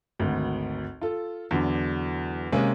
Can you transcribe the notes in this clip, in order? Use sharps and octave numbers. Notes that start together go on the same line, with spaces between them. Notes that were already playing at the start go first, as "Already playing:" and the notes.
G#1 D2
F4 A4
E2 D3 F#3 D4
C3 G#3 A#3 C#4